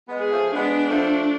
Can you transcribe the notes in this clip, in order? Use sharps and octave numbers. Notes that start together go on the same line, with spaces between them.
G#3 B3
G#4
F3 A3
G#3 B3 D4
F3 A3